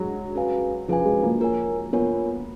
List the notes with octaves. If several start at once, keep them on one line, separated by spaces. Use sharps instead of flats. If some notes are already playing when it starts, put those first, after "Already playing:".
Already playing: F#3 G#3
C#4 G#4 B4 F5 G#5
F3 C#4 G#4 B4 F5 G#5
G#3
A#3
F4 A#4 C#5 G#5
B3 F4 A#4 C#5 G#5